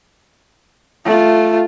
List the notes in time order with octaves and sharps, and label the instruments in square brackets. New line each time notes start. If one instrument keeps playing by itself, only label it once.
[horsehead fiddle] A3 F4